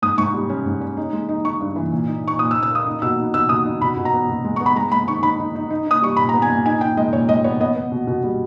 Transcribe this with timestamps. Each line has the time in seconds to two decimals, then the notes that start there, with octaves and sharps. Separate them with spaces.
0.02 G#2 D#6
0.18 G#2 C#6
0.34 G3
0.49 C#4
0.66 G#2
0.81 C#4
0.97 D#4
1.13 G#3
1.29 D#4
1.45 D#4 C#6
1.60 G2
1.76 E3
1.92 A#2
2.07 D#4
2.24 D#4 C#6
2.39 A#2 D#6
2.51 E6
2.55 A#2
2.63 E6
2.70 A#3 D#6
2.87 D#4
3.02 B2 E6
3.18 D#4
3.34 B2 E6
3.49 B2 D#6
3.66 D#4
3.81 B2 B5
3.97 B2
4.05 A#5
4.13 B3
4.29 B2
4.44 G#3
4.56 B3 C#6
4.66 B5
4.76 G#3 A#5
4.91 G#3 B5
5.08 D#3 C#6
5.23 D#4 B5
5.40 D#4
5.55 D#4
5.70 D#4
5.87 D#4 D#6
6.02 G3 C#6
6.17 A#2 B5
6.29 B3 A#5
6.42 G#5
6.50 A#2
6.66 D#4 G#5
6.81 D#4 G5
6.97 G#3 D#5
7.13 A#2 C#5
7.29 G#3 D#5
7.44 B3 C#5
7.60 B3 D#5
7.76 B3
7.92 B2
8.07 B2
8.24 G3